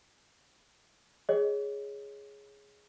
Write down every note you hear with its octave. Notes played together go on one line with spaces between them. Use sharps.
G#4 C#5 D#5